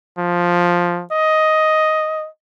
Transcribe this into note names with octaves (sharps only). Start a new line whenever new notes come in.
F3
D#5